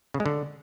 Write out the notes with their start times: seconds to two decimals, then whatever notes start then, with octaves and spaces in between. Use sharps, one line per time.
0.14 C#3
0.20 G#3
0.26 D3